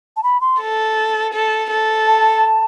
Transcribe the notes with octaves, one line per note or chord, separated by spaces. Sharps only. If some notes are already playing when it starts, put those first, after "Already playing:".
A5
B5
C6
A4
A4
A4
A5